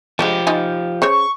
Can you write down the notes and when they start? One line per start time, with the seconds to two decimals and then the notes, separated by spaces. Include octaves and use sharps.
0.19 F3 G#3 C#4 D4 G4
0.47 D#4 F4 G#5
1.02 C#3 C5 C#5 C#6